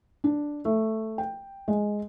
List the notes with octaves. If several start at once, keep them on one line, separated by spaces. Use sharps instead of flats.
D4
A3
G5
G#3